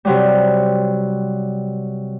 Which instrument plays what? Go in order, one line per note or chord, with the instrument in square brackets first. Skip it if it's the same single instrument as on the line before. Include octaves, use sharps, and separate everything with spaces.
[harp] C3 F#3 G3